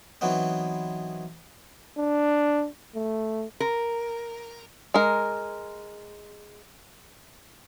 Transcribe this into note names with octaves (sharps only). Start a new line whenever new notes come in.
E3 F#3 B3 C4 D#4
D4
A3
A#4
G#3 A#4